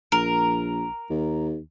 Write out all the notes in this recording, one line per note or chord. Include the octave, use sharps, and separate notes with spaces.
A#1 A#4
D#2